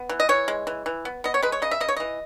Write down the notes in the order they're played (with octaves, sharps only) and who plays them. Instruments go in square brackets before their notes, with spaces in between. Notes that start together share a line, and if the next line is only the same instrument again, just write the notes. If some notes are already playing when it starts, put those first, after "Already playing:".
Already playing: [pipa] B3
E3
D#5
E3 C#5
G#3
E3
E3
B3
B3 D#5
C#5
G#3 B4
C#5
C#3 D#5
E5
C#3 D#5
C#5
E3 D#5